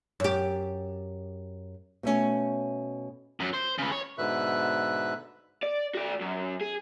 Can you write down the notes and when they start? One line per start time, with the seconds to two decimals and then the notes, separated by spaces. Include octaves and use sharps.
0.20 F#2 G4
2.03 B2 A3 C#4
3.40 F#2 F#3
3.54 C5
3.78 C#3 B4
3.92 C#5
4.18 G#2 B2 D3 B4 E5 F#6
5.63 D5
5.95 F#4 D5
6.21 F#2
6.61 G#4